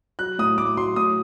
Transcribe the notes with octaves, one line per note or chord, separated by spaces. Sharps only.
F#3 F#6
A2 D#6
A2 D6
F#3 C6
A2 D#6